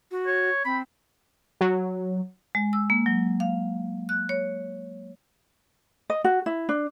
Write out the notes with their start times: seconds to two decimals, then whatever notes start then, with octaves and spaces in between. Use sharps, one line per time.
0.11 F#4
0.26 C#5
0.65 C4 B5
1.61 F#3
2.55 G#3
2.73 E6
2.90 A#3
3.06 F#3
3.40 F5
4.09 F#6
4.29 C#5
6.10 D#5
6.24 F#4
6.46 E4
6.69 D4